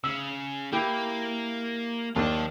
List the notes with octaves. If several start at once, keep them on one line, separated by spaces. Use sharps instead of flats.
C#3 E6
A#3 E4 G4
D#2 D4 F4 A5